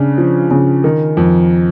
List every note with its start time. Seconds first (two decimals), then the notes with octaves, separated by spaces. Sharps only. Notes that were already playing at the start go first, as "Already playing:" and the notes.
Already playing: C#3 D4
0.18 F3
0.51 C#3
0.84 D#3
1.17 F2